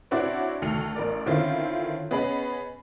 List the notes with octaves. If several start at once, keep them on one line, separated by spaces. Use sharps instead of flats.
C4 D4 E4 F#4 C#5 D5
D2 D#3 C#7 F7
A1 A#4 D5
D3 D#3 C4 C#4 E4 F4
B3 C#4 G#4 D#5 B5